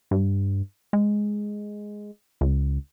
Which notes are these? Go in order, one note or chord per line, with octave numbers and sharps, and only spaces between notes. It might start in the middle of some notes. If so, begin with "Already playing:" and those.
G2
G#3
C#2